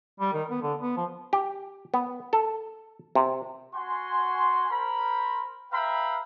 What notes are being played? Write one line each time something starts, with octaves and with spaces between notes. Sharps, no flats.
G3
D#3
B3
D3
B3
F3
G4
B3
A4
C3
F#4 G#5 C6
A#4 C5 B5
B4 E5 F5 G5 A#5 B5